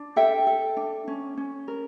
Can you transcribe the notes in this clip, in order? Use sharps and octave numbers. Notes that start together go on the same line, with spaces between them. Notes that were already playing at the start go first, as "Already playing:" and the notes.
Already playing: D4
A4 E5 G5
A4
D4
C#4
C#4
A#4